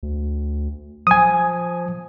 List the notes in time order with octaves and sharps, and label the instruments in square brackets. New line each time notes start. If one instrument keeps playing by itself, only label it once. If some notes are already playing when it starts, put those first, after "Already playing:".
[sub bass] D2
[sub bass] F3 [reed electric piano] G#5 D#6